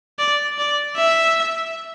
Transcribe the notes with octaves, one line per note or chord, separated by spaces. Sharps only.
D5
D5
E5